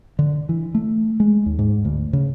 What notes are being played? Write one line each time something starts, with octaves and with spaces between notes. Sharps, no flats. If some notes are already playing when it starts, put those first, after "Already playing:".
D3
E3
A3
G#3
D#2
G#2
D2
C#3